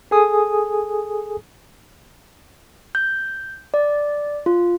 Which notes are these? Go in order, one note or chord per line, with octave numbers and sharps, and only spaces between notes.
G#4 A4 G#5 D#6
G6
D5
F4